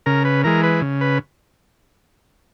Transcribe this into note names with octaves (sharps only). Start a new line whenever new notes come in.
C#3 A#4
B4
E3 G#3 A#4
B4
C#3
B4